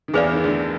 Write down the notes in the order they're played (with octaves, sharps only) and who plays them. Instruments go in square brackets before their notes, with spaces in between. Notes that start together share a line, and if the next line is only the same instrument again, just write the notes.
[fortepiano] D#3
[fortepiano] E2 E3 [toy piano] G#4 B4 D5 F5
[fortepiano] D#3
D2 D3